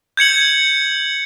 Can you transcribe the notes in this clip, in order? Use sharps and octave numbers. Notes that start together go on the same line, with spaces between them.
G6 G#6 C#7 F#7